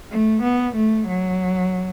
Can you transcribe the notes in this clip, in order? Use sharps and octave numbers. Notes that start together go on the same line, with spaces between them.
A3
B3
A3
F#3